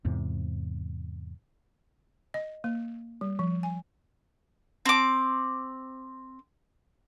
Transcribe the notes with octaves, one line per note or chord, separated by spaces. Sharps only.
E2 G#2 C3
D#5
A#3
G3
F3
G#5
C4 D6